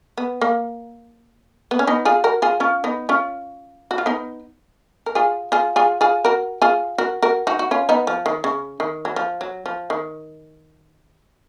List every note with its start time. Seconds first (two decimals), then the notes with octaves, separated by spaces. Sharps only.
0.17 B3
0.41 A#3
1.71 B3
1.79 C#4
1.87 B3 D#4
2.05 F4 G#4
2.24 F#4 A#4
2.42 F4 G#4
2.60 C#4 F4
2.84 B3 D#4
3.09 C#4 F4
3.91 F#4
3.98 F4
4.06 B3 D#4
5.06 A#4
5.15 F4 G#4
5.52 F4 G#4
5.76 F4 G#4
6.01 F4 G#4
6.25 F#4 A#4
6.62 F4 G#4
6.98 F#4 A#4
7.22 F#4 A#4
7.47 D#4 F#4
7.59 F#4
7.71 C#4 F4
7.89 B3 D#4
8.07 F3
8.26 D#3
8.44 C#3
8.80 D#3
9.05 F#3
9.16 F3
9.41 F#3
9.66 F3
9.90 D#3